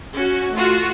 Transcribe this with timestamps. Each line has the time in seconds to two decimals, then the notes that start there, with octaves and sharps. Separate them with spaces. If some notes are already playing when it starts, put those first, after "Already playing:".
0.14 C#4 F#4
0.54 A3 F4 F#4